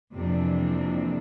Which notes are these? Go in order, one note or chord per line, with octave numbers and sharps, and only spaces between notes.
F2 C3 E3 A#3 D4